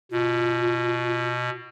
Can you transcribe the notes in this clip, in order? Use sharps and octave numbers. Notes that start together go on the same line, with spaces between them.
B2 F4